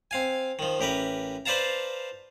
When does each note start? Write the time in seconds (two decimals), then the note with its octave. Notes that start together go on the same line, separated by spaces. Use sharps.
0.11 C4 F5 G#5
0.59 D#3 F3
0.80 A1 G4 A#4 B4
1.46 B4 C5 D5 F5 A5 A#5